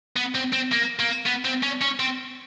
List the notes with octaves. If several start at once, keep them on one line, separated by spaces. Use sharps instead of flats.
B3
C4
C4
A#3
A#3
B3
C4
C#4
C#4
C4